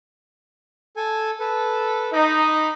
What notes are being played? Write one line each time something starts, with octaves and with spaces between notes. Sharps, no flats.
A4 G#5
A4 B4
D#4 B5 D6